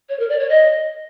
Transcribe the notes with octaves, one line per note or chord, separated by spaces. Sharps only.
C#5
A#4
D5
C#5
D#5